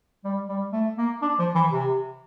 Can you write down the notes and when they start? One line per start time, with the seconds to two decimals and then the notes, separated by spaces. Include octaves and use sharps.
0.24 G3
0.49 G3
0.73 A3
0.98 A#3
1.22 D4
1.39 F3
1.55 E3
1.72 C3